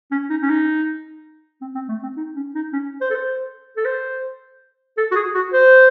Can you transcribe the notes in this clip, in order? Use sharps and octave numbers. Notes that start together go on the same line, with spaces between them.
C#4
D#4
C#4
D#4
C4
C4
A3
C4
D#4
C#4
D#4
C#4
C5
A4
C5
A4
C5
A4
F#4
G#4
F#4
C5